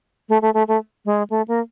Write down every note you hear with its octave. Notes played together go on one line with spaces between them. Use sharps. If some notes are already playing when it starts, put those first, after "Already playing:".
A3
A3
A3
A3
G#3
A3
A#3